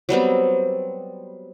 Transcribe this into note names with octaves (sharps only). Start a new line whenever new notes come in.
F#3 G3 B3 C4